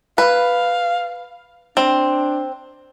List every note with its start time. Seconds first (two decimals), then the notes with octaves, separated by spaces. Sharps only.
0.18 B4 F5
1.77 C4 D4